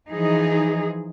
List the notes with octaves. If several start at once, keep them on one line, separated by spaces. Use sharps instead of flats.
E3 F3 D#4 G#4